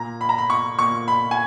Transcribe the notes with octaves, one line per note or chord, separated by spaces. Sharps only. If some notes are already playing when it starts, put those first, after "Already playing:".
Already playing: A#2 A#5
B5
A#5
B5
C#6
A#2 C#6
B5
G#5